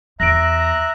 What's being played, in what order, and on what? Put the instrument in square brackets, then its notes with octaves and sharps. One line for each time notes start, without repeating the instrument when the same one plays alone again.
[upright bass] E2 [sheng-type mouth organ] E5 A#5 F#6 [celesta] A#6 D7